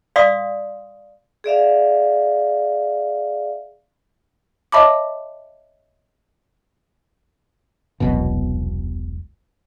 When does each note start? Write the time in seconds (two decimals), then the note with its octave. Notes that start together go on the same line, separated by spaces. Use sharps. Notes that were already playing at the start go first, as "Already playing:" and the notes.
0.16 D5 F5 C6 D#6
1.44 G#4 D5 E5 F5
4.72 C#5 D#5 E5 A5 B5 D6
8.00 E1 C2 F#2 B2